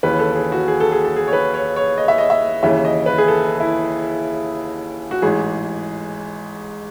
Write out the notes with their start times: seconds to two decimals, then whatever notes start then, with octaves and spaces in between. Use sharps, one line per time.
0.03 D#2 C#3 E3 B4
0.19 A4
0.35 G#4
0.52 F#4
0.68 G#4
0.80 A4
0.92 G#4
1.04 A4
1.16 G#4
1.28 C#5
1.33 B4
1.54 C#5
1.76 C#5
1.98 D#5
2.08 E5
2.18 D#5
2.30 E5
2.63 D#2 C#3 E3 E5
2.85 D#5
3.06 B4
3.18 G#4
3.28 A4
3.60 E4
5.11 F#4
5.22 A1 G#2 E3 G#4